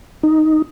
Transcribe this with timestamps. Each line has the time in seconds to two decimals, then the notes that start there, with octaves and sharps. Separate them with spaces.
0.23 D#4